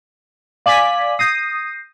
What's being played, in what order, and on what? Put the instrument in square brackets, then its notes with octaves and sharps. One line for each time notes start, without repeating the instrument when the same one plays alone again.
[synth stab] D5 G#5 B6 [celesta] F5 D6 F#7
[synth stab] D#6 [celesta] G6 A#6 C7